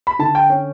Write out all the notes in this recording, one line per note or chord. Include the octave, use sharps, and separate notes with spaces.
B5
D3 A5
G5
C#4